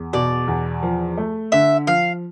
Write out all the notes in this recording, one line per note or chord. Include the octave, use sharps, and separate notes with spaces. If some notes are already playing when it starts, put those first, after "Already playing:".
Already playing: E2
B2 D5
E2
F3
A3
D3 E5
F3 F5